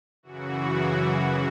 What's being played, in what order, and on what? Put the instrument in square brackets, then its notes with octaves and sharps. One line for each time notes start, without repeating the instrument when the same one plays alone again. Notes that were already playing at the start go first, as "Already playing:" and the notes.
[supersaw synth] F#2 C#3 E3 F#4